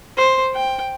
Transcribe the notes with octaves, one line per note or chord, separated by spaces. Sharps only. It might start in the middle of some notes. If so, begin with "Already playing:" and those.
C5
G5